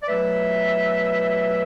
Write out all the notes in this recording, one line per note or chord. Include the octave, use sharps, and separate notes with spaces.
D5
B2 F#3 A3 B4 E5